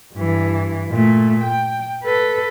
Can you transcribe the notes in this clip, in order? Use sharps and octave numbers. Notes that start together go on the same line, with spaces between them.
G2 E3
A#2 A3
G5
A4 B4